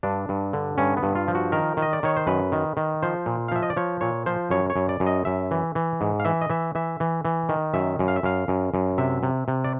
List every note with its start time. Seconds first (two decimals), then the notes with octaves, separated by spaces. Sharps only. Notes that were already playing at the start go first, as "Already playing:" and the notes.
0.03 G2 D4
0.29 G2
0.53 D3
0.78 G2 C#4
0.97 B3
1.03 G2
1.15 F4
1.28 F3
1.35 F#4
1.52 D#3 A#4
1.77 D#3
1.82 D#5
1.93 D5
2.03 D#3 C#5
2.17 C5
2.27 F#2 B4
2.52 D#3
2.77 D#3
3.03 F3 C5
3.26 A#2
3.48 F5
3.52 F3 E5
3.63 D#5
3.70 D5
3.76 F3 C#5
4.01 A#2 C#5
4.26 F3 C5
4.51 F#2 C#5
4.70 C#5
4.76 F#2
4.89 D5
5.00 F#2
5.06 D#5
5.25 F#2 E5
5.51 E3
5.75 E3
6.01 G#2
6.20 F5
6.25 E3 E5
6.41 D#5
6.50 E3 E5
6.75 E3 E5
7.00 E3
7.25 E3
7.49 D#3
7.74 F#2 E5
7.99 F#2
8.08 F5
8.16 E5
8.23 F#2 F5
8.48 F#2
8.74 F#2
8.98 C3 E5
9.23 C3
9.48 C3
9.64 D5